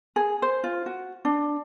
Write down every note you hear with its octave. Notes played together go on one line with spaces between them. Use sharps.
G#4
C5
F4
F#4
D4